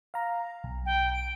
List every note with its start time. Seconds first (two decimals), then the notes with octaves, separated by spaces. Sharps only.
0.14 F5 A#5
0.64 B1
0.86 G5
1.13 D7